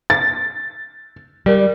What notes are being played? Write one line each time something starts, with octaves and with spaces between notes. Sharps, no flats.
A6
G3 A#4 D5